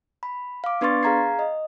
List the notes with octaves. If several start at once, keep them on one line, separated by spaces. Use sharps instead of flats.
B5
F5 D6
B3 D4 B4 C6 C#6 A6
G#4 F5 A#5 G#6 C7
D#5